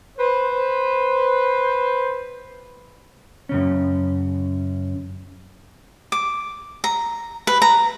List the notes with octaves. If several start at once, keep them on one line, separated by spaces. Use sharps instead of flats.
B4 C5
F#2 C#3 C#4
D6
A#5
B4
A#5